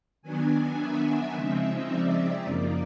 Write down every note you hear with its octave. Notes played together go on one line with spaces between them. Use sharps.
D#3 F#3 B3 D4 G#5
E5
C#3 F3 G#3 C4 D#4
D5
F#2 C#3 F3 A#3 D#4 D5